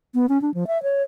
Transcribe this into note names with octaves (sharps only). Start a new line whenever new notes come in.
B3
C#4
D4
F3
E5
C#5